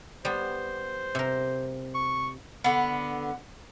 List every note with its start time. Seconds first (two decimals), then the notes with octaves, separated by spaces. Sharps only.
0.25 G3 B3 C5
1.15 C3 A#4
1.94 C#6
2.64 D3 B3